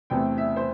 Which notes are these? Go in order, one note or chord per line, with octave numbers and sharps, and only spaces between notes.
E2 C3 E3 A3 C4 G5
E5
C5